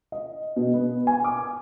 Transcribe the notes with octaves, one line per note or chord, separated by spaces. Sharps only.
D#5
B2
B3
G#5
D6